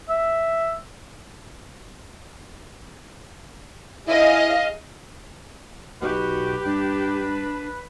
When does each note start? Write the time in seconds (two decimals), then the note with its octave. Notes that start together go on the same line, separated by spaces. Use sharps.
0.09 E5
4.08 E4 G#4 D#5 F5
6.02 B1 B2 F#4 G4 B4
6.65 G2 D4